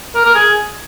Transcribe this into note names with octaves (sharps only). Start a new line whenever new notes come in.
A#4
A#4
G#4